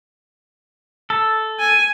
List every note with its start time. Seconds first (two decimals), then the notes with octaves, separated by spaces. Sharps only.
1.10 A4
1.60 G#5